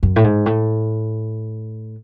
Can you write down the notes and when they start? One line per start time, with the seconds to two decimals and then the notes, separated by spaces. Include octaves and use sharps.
0.03 F#2
0.16 A2
0.24 G#2
0.46 A2